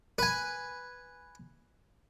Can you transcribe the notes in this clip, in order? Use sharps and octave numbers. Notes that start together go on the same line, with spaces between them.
B4 G#5